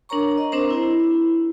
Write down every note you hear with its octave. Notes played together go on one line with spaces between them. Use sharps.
D4 A#4 C#5 A#5 C#6
D#5
C4 D4 A#4 C5 A#5
E4